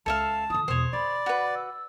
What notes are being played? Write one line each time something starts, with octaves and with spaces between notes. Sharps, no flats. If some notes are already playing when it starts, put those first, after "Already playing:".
C#2 A4 E5 F5 A5
D3 F4 D#6
E2 B2 C5 C#5
D3 D5 B5
F#4 B4
E6